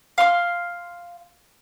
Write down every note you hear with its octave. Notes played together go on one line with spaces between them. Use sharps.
F5 C6 C#6 F6